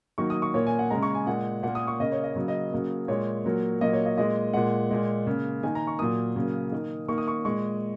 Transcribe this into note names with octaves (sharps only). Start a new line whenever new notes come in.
D#3 F#3 A#3 C#6
D#6
C#6
A#2 A#3 C#5
G#5
F#5
C#3 G#3 A#5
C#6
G#5
A#2 G#3 F#5
A#2 A#3 F#5
D#6
C#6
C#3 A#3 D#5
C#5
D#5
C#3 F#3 A#3
D#5
C#3 F#3 A#3
A#2 G#3 C#5
A#2 F#3 A#3
A#2 F#3 A#3 D#5
C#5
D#5
A#2 G#3 D#5
A#2 G#3 F#5
A#2 G#3
C#3 A#3
D#3 A#3 G#5
A#5
C#6
A#2 F#3 A#3 D#6
C#3 F#3 A#3
D#3 A#3
D#3 A#3 C#6
D#6
C#6
A#2 G#3 C#6